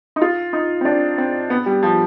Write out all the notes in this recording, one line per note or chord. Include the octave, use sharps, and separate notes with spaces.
D#4
F4
D#4
C4
D4
C4
B3
G3
F3